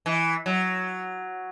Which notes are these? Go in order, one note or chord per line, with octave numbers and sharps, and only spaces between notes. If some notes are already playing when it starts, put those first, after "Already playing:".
E3
F#3